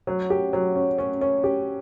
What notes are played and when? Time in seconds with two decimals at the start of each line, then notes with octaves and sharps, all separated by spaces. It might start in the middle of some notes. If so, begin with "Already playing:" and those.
0.07 F#3
0.30 G4
0.53 F#3
0.75 C#4
0.98 C#4
1.21 C#4
1.44 G4